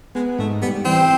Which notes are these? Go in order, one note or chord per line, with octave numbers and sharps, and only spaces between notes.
G#3 B3
G#2 A3
G3 B3
E3 C4